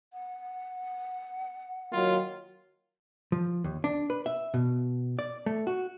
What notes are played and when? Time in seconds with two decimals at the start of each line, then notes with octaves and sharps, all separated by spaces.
0.13 F#5
1.93 D#3 F#3 A#3 F4
3.32 F3
3.64 D#2
3.84 D4
4.10 B4
4.26 E5
4.54 B2
5.19 D5
5.46 A3
5.67 F#4